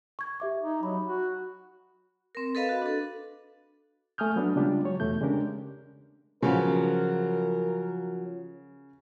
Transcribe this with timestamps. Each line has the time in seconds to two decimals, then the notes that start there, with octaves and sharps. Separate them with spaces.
0.19 C#6 G#6
0.40 G4 E5 D6
0.61 D#4
0.83 F#3 B5
1.06 F#4
2.35 C4 A#4
2.55 A4 B4 D#5 F5 B5
2.69 F#4
2.82 D4 A4
4.18 A3 G#5 D#6 F6 G6
4.36 F#3 B3 D4 F#4
4.56 C#3 G3 G#3 D4 F4 G4
4.84 F#3 C#5
5.00 E2 B2 A3 G6
5.20 C#3 G#3 C#4 D4 G4 A#4
6.43 C#3 F3 F#3 B3 A#4